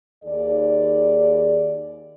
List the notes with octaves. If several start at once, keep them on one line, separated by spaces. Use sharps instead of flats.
D#2 D#4 G#4 D5